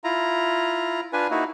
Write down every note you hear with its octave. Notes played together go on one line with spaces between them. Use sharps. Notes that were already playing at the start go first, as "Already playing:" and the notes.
E4 F4 A#5
D4 F4 B4 G#5
A#3 D#4 E4 F#4